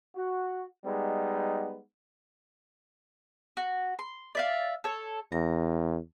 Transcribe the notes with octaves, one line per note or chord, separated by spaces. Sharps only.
F#4
G3 G#3 B3 D#4
F#4
C6
D5 E5 F5
A4 C#5
E2 A#5